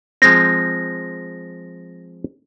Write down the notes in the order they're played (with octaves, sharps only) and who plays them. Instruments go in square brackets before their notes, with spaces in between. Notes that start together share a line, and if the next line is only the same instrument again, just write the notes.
[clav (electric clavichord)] F3 G#3 C4 [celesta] A#6